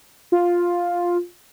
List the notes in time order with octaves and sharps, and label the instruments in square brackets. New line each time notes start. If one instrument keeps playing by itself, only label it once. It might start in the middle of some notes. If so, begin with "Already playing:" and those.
[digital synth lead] F4